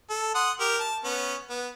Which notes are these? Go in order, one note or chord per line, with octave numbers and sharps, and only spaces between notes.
A4
F#5 C6 D#6
G4 A#4
A5
B3 C#4
B3